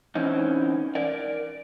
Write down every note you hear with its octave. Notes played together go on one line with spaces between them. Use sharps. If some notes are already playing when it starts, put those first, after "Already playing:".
E3 C4 C#4 D#4
A#4 D5